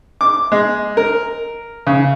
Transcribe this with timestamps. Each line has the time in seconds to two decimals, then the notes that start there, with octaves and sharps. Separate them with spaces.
0.21 D6
0.52 G#3
0.97 A#4
1.87 C#3